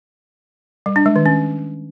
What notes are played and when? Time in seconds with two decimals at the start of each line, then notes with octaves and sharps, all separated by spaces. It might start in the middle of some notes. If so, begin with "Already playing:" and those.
0.86 G3
0.96 D4
1.06 G#3
1.16 D#3
1.26 C#4